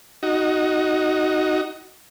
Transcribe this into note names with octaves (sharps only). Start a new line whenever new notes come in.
D#4 F#4